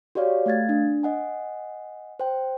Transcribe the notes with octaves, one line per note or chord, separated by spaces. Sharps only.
F#4 G4 C#5 D5 F5
A3 F5 G#6 A6
D4
D#5 F#5 G#5
C5 G5